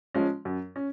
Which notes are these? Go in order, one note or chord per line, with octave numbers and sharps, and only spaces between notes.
F3 G#3 C#4
F#2
C#4